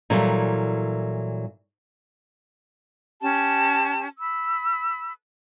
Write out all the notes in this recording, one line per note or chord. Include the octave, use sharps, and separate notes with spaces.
A#2 E3 F#3 G3 E4 A4
C#4 G4 A5
B5 E6